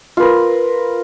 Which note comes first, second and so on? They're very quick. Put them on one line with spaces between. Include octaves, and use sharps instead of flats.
F4 B4 A#4